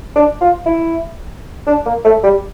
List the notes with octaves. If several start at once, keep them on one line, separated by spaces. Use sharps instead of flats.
D4
F4
E4
D4
A#3
A3
G3